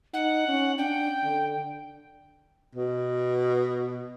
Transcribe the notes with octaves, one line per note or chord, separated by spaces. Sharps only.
D#4 F#5
C#4
D4 G5
D3
B2